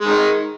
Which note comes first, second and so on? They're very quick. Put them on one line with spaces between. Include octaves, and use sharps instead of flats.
G#3 D#3 D#4